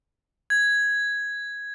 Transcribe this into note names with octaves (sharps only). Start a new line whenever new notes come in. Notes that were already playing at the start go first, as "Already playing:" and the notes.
G#6